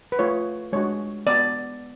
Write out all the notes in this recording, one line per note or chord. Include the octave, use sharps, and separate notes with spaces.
B4
A3 F4 C#5
G#3 D4 F#4 C#5
B3 F#4 D5